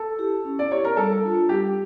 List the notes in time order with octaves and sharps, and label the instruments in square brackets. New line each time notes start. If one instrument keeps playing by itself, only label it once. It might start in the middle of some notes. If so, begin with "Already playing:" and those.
Already playing: [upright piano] A4
[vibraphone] E4 G4
C#4
[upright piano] D5
[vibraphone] E4 G4 [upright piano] C#5
[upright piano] A#4
[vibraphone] G3 [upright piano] A4
[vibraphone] D4 F4
[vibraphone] G3 [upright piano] G4